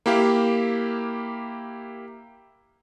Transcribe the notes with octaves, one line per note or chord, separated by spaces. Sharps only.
A#3 E4 G4 F5